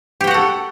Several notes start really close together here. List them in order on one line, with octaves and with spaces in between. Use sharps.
G4 G5 F#4 F#5 A4